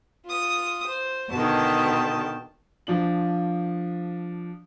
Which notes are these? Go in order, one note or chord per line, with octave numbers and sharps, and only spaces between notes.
F4 D#6
C5
B2 D3 D#3 G5 A5
F3 D4 F#7